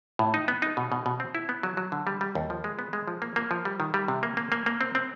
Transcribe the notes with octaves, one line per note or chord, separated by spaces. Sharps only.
A2
D#4
B3
D#4
B2
B2
B2
C4
E4
B3
F#3
F#3
D3
G3
G3
D#2
F3
G#3
B3
G#3
F3
A#3
A#3
F3
G3
D#3
G3
C3
A#3
A#3
A#3
A#3
C4
C4